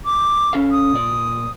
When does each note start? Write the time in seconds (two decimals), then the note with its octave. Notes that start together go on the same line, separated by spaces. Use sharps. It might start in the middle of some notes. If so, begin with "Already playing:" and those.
0.05 D6
0.53 C#4 A4 F5
0.71 D#6
0.93 A#2 D5